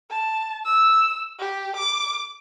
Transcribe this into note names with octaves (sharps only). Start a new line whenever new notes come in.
A5
E6
G4
D6